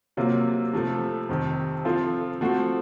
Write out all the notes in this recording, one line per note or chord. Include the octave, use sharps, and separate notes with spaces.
C3 F#3 A#3 F4
C3 F3 A3
F2 C3 D#3
F3 C4 F4 A4
F3 A3 C4 F#4